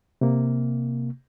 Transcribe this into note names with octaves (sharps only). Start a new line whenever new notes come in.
C3 A#3